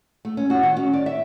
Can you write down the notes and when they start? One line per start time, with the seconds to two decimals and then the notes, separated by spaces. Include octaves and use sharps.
0.25 A3
0.37 C#4
0.50 F#4
0.63 D#3
0.77 C#4
0.93 D5
1.06 E5